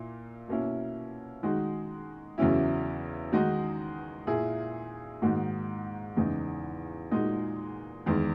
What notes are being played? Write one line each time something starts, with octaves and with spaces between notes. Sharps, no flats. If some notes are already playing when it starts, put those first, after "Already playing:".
Already playing: A#2 A#3 E4
B2 A#3 C#4 E4
D#3 G#3 D#4 F#4
E2 C#3 F#3 C#4 E4
D#3 G#3 D#4 F#4
A#2 A#3 E4 G#4
G#2 D#3 A#3 D#4 F#4
E2 C#3 G#3 D#4
A#2 G#3 D#4 F#4
E2 D#3 G#3